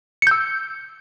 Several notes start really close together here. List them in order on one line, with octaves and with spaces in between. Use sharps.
C#7 G6 E6